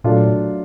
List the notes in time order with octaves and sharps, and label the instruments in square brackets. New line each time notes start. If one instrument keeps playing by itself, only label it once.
[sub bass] A#2 [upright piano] F#3 A3 D4 F4